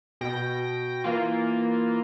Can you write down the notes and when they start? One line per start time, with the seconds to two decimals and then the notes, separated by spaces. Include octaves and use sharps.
0.21 B2 G5 A#6
1.04 E3 A#3 F4